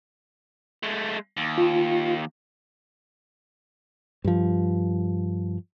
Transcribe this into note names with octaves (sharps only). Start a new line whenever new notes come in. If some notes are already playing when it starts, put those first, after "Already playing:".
G#3 A3
D#2
F4
G2 F3